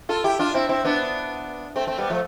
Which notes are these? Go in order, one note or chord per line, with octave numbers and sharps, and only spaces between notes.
F4 A4
E4 G4
D4 F4
C4 E4
C4 E4
B3 D4
A3 C4
A3 C4
G3 B3
F3 A3